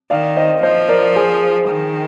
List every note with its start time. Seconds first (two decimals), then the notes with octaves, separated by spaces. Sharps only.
0.10 D#3 D5 F5
0.36 C5 D#5
0.63 F3 C5 D#5
0.89 A#4 D5
1.15 G#4 C5
1.69 D#3